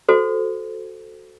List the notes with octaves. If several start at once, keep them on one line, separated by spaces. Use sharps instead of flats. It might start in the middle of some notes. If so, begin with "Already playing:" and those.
F#4 A4 C5